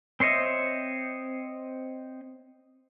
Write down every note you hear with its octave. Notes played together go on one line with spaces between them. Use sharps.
C4 C5 C#5 D#5 E5